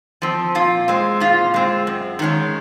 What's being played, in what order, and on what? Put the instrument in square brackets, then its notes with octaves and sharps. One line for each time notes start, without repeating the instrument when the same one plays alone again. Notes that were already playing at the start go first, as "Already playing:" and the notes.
[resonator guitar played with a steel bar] F3 C4
A#2 F4
G#3 C4
A#2 F4
G#3 C4
F#2
D#3 G#3 C#4